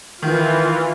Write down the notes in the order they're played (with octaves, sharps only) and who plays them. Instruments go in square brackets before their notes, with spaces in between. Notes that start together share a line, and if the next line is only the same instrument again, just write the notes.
[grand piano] D#3 [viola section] E3 F4